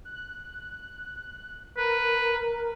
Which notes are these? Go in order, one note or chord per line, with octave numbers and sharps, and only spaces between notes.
F#6
A#4 B4